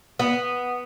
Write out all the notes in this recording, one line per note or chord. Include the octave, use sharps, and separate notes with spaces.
B3